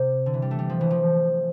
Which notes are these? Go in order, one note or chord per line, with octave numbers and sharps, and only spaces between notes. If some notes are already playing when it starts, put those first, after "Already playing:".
Already playing: C3
D3
E3
G3
A3
G3
F3
E3
F3